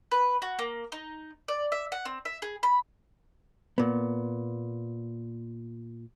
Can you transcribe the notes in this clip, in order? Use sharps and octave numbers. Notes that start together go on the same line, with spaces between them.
B4
F#4
A#3
D#4
D5
E5
F#5
C4
E5
G#4
B5
A#2 B3